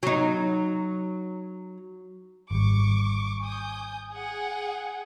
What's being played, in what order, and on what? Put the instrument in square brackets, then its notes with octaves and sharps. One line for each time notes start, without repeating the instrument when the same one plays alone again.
[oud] F#3 D#4
[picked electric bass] G#1 G3 [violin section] C#6 D6
[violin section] G#5 D#6 G6
G#4 F#5 G5